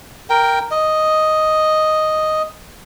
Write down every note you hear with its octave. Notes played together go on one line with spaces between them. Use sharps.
A#4 G5
D#5